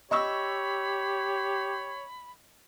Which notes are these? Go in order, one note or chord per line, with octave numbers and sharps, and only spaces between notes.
G4 C#5 D#5 B5 C#6 E6